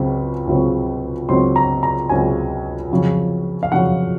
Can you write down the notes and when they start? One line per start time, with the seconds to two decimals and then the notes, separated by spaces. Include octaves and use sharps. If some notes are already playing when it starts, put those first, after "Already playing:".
Already playing: C#2 C#3 F#3 C4
0.47 C#2 C#3 F#3 C4
1.29 C#2 C#3 F#3 C4 C6
1.56 A#5
1.83 A#5
2.09 C#2 C#3 F#3 C4 G#5
2.91 F2 C#3 F#3
3.63 F5
3.72 F2 C#3 F#3 F#5